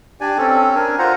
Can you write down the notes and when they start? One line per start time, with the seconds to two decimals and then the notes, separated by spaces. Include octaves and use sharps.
0.21 D4 G4 D5 G#5
0.38 C4 C#4 A4
0.75 D4 A#4 G#5
0.99 F4 C5 F#5 A#5